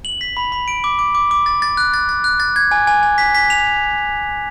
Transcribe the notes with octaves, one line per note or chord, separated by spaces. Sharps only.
F#7
B6
B5
B5
D7
D6
D6
D6
D6
A6
A6
F#6
A6
A6
F#6
A6
G#6
G#5
G#5
G#5
B6
B6
F7